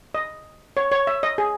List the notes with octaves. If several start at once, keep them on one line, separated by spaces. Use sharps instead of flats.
D#5
C#5
C#5
E5
D#5
G#4